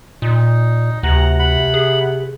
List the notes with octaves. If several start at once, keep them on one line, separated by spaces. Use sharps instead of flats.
A#2 D#4
D2 C3 F#5 A#5
F#5 B5
G#4